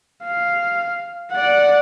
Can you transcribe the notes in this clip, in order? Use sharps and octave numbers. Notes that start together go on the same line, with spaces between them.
F5
D5 F#5